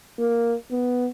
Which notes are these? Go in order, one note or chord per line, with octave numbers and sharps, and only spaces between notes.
A#3
B3